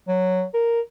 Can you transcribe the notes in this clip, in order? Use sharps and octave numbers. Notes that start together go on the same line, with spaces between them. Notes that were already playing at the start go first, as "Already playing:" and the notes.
F#3
A#4